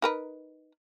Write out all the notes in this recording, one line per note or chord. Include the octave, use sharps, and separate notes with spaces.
D#4 A#4 B4